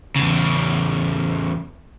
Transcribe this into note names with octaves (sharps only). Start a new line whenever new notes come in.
E2 C#3